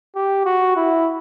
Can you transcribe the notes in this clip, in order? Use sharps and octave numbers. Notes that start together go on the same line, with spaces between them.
G4
F#4
E4